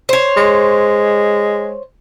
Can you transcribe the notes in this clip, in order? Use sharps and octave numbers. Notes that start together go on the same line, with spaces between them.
C5 C#5
G#3